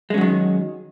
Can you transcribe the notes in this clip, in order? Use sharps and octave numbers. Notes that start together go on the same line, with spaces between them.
D#3 F#3 G#3 C#4